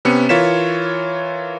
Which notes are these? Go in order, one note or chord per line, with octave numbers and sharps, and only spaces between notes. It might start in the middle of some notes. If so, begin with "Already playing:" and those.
C3 B3 C#4 C#7
E3 F4 A#4 C#5 B6 E7